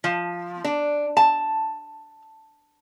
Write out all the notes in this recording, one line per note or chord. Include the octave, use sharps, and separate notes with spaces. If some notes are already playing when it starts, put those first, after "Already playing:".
F3
D4
A5